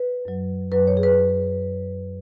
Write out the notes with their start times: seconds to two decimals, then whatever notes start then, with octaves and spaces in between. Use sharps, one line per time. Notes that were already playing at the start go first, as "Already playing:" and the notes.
Already playing: B4
0.25 F#2 F#3
0.72 F#2 F#3 B4
0.87 C#5
0.97 G#4
1.03 B4